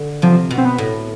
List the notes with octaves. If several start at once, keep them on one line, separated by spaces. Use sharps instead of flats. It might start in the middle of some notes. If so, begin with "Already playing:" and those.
Already playing: D3
C3 F3
B2
C4
B3
A2